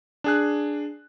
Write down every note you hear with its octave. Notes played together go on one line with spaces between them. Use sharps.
D4 G#4 F#6